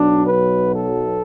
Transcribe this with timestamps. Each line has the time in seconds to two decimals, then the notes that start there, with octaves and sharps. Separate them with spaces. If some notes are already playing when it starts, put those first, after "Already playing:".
Already playing: B1 B2 F#3 D4
0.26 B4
0.74 A4